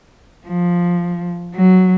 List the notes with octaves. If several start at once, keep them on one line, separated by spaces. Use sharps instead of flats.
F3
F#3